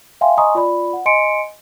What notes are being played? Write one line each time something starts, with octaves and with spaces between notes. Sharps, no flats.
E5 F5 G5 G#5 C6
D#5 G#5 A#5 C6 C#6 D#6
F4 D5 B5
F#5
D#5 G#5 C6 C#7 D7